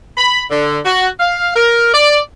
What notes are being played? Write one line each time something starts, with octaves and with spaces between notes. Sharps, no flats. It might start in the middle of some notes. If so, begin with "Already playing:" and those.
B5
D3
F#4
F5
A#4
D5